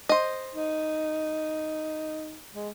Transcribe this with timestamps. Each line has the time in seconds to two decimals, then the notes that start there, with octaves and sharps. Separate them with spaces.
0.09 C5 D#5
0.55 D#4
2.54 G#3